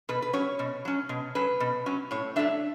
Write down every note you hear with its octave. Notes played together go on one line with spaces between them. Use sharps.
B2 B4
B4
F#3 C#4 C#5
B2
F#3 C#4
B2
F#3 C#4 B4
B2
F#3 C#4
A2 C#5
F#3 A3 D4 E5